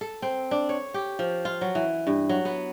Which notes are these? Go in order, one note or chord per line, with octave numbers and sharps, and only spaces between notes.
A4
C4
D4
C#5
G4
F3
F4
F#3
E3
G2
F#3
B3